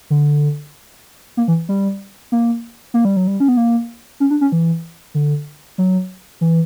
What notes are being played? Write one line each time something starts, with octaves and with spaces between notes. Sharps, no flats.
D3
A#3
E3
G3
A#3
A#3
G3
F#3
G3
C#4
B3
A#3
C#4
D4
C#4
E3
D3
F#3
E3